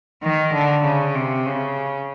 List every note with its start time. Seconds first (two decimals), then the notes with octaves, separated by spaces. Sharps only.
0.23 D#3
0.54 D3
0.85 C#3
1.16 C3
1.46 C#3